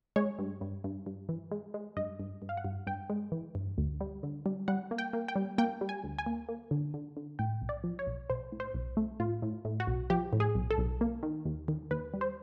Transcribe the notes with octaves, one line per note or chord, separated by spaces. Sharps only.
G#3 C#5
G2
G2
G2
G2
E3
G#3
G#3
G2 D#5
G2
G2
F5
F#5
G2
G2 G5
G#3
E3
G2
D2
G3
D3
G3
G3 F#5
A#3
G5
A#3
G5
G3
A#3 G5
G3
G#5
D2
G#5
A#3
A#3
D3
D3
D3
A2 G5
B1
D5
F3
C#5
B1
B1 C5
A2
C5
B1
A3
A2 F4
A2
A2
F#4
B1
F3 G4
A2
G#4
B1
A4
B1
A#3
D#3
D#2
D#3
D#2 B4
G3
C5